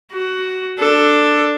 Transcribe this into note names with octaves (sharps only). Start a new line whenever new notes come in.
F#4
D4 A4